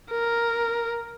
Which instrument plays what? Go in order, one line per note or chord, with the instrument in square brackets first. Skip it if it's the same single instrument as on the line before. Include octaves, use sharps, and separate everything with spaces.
[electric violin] A#4